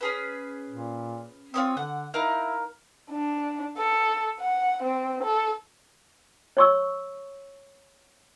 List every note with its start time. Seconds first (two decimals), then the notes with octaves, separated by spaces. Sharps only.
0.01 C#4 G#4 B4
0.70 A#2
1.54 C4 F4 C#5 D#6
1.77 D3 F#5
2.14 D#4 E4 A#4 F5
3.11 D4
3.78 A4
4.40 F#5
4.83 C4
5.23 A4
6.57 C#5 C#6 E6